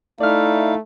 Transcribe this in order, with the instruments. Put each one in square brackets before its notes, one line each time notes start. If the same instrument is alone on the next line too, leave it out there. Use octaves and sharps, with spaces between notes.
[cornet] A3 [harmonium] D#4 E4 F5 [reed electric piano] D5 F6